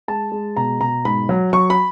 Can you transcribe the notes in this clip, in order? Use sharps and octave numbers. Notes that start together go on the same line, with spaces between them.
G#3 A5
G#3
B2 A#5
B2 A#5
G#2 B5
F#3
F#3 C#6
B5